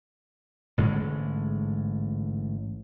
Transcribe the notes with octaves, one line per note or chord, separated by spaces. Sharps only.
A1 G#2 D3 G#3